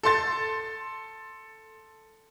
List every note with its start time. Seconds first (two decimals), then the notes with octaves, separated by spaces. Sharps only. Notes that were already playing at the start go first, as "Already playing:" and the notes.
0.03 A4 C6 A6